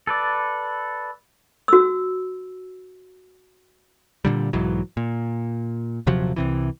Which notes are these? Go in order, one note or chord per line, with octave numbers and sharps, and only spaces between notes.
A4 B4 D5
F#4 E6
A#2 D3 G3
B1 G#2 E3 F#3
A#2
D#1 C3 F3 F#3
C2 C3 E3